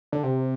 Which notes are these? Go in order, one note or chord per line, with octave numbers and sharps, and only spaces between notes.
D3
C3